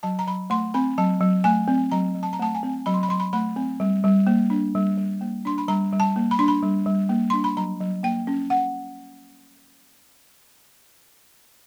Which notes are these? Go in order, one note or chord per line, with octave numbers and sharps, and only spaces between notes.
F#3 A5
A#5
F#3 B5
A3 C6
C4 B5
F#3 A5
F#3
A3 G#5
C4
F#3 A#5
F#3
A5
A#5
A3 A5
G#5
C4
F#3 B5
C6
B5
F#3 C6
B5
A3 B5
C4
G3
G3
A#3
D4
G3
G3
A#3
D4 C6
B5
G3 A#5
G3
A5
A#3
B5
D4 C6
B5
G3
G3
A#3
D4 C6
B5
F#3 A#5
F#3
A#3 G5
C#4
F#5